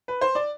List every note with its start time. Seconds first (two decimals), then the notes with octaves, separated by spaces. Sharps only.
0.08 B4
0.21 C5
0.35 D5